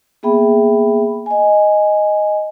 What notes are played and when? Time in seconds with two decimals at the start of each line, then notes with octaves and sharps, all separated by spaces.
0.23 A#3 B3 G#4 E5 G5 B5
1.26 D#5 G#5